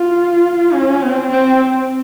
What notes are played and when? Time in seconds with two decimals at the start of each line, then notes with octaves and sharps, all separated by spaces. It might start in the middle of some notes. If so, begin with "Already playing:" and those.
Already playing: F4
0.73 C#4
1.02 C4
1.31 C4